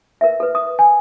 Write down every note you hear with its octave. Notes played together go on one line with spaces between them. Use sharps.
A#4 B4 E5
A4 B4
D#6
G#5